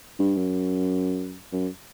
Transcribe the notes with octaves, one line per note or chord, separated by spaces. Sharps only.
G2
F#2
F#2